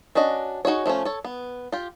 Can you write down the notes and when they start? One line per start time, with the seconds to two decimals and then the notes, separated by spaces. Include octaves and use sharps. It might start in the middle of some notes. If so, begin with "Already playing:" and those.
0.15 C#4 D4 F#4 D#5
0.65 D#4 F#4 G#4 C#5
0.86 F3 A3 B3 C#4
1.05 A4 C#5
1.25 B3
1.72 F4 G4